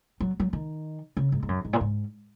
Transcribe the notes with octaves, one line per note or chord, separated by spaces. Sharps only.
F#3
F#3
D#3
C#3
G#2
G#2
F#2
G#2
A#2
G#2